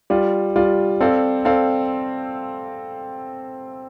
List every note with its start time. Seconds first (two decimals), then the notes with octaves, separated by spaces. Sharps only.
0.10 G3 F4 D5
0.56 G3 F4 D5
1.01 C4 A4 D5 F5
1.45 C4 A4 D5 F5